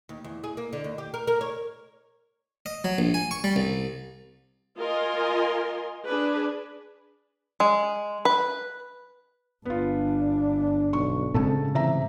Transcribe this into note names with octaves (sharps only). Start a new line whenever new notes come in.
D#2
E2
G#4
A#3
D3
D#2
G4
A#4
A#4
C#5
D#5
F#3
A#1
G#5
C#6
G3
C2
F4 A#4 D#5 G#5 C6
D4 G#4 B4
G#3
B4
G1 B3 D4 F4
B1 C#6
A2 C#3 G#3 C4 A4 A5
C3 E3 E5 A#5